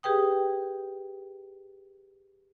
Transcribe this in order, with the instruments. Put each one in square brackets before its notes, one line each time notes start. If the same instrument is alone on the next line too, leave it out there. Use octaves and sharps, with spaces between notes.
[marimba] G4 G#4 B4 G5 D#6